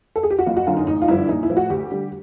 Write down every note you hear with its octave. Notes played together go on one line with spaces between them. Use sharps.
A4
G#4
G4
F#4
F#1 F4
F#4
F#2 D3 F4
D#4
A1 D#4
F4
G2 D3 F3 E4
A#1 D#4
E4
A2 F3
F#4
D2 G4
D3 G3